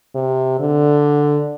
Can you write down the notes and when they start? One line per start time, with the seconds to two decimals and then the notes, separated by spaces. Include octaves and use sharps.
0.15 C3
0.60 D3